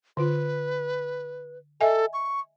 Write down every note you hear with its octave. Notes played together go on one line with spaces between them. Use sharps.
D3 F4 B4
A4 D#5 E5 G#5
C#6